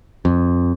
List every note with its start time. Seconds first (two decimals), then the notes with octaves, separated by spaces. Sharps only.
0.25 F2